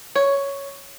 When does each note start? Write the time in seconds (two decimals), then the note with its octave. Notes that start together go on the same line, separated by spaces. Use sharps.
0.16 C#5